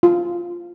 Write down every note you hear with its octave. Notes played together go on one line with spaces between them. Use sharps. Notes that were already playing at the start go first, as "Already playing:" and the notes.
F4